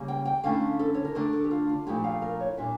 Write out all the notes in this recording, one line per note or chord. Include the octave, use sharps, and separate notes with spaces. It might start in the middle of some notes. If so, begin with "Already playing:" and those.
Already playing: C#3 G3 A#3
G5
G5
D3 A3 C#4 E4 F5
A4
C#5
A#4
D3 A3 D4 A4
A4
G4
F4
F4
A#2 F3 A3 E4 G4
F5
A#4
C#5
A#2 G3 D4 E5